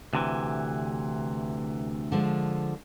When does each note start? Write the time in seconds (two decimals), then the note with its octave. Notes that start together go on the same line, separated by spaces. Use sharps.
0.13 D2 C3 E3
2.12 D3 F3 G#3